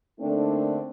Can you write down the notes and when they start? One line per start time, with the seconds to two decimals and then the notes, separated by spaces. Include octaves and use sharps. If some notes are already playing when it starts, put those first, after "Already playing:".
0.20 D3 A3 A#3 C4 D4 D#4